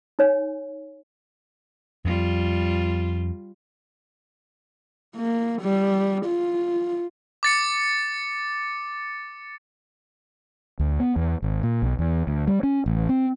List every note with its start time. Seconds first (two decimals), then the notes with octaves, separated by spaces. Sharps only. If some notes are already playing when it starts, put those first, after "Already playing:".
0.19 D#4 C#5 G#5
2.05 F2 G3 F4
5.16 A#3
5.62 G3
6.25 F4
7.43 D6 A6 C#7
10.79 D2
11.00 B3
11.16 E2
11.42 G#1
11.63 A#2
11.82 B1
11.99 E2
12.27 D2
12.48 G3
12.63 C#4
12.86 A1
13.09 C4